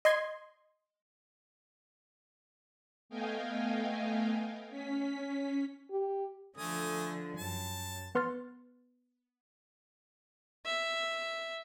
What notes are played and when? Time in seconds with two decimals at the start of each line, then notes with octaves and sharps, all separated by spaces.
0.05 D#5 C6 G#6
3.09 A3 B3 D#5 F5 G5 G#5
4.70 C#4 B6
5.91 G4
6.57 D3 F3 A3 G#5 D#6
7.38 F#2 A5
8.15 B3 B4 C6 F6 A6
10.65 E5